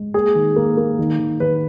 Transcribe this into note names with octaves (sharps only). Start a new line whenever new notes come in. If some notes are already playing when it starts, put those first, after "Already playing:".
Already playing: G#3
A#3 G#4
D#3
A#3
A#3
D#3
D#3
D#3 B4